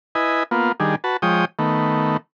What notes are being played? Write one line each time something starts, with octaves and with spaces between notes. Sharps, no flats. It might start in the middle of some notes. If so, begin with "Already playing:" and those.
E4 B4 D#5 G#5
A#3 B3 F4
D#3 G3 D4 G#4
F#4 B4 A5
F3 G#3 C#5 G5 D#6
D#3 A3 B3